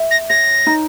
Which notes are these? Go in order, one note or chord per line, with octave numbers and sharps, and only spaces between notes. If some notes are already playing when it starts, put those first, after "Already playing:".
Already playing: E5
A#6
C#5 A#6
D#4